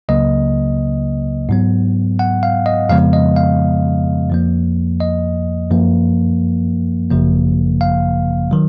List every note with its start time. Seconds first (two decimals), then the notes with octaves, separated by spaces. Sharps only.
0.09 C#2 C#3 F#3 A#3 D#5
1.49 G#2 F#3 B3
2.19 F#5
2.43 F5
2.66 D#5
2.89 F2 C#3 F3 G#3 B3 F5
3.13 D#5
3.36 F5
4.30 F2 F3 A#3
5.00 D#5
5.71 F#2 F3 A#3
7.11 G#1 F#2 C#3 F3 A#3
7.81 F5
8.51 D#3 F#3